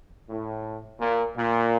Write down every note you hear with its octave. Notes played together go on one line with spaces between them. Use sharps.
A2
A#2
A#2